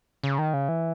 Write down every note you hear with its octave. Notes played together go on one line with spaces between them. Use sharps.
C#3
D#3
C#3
E3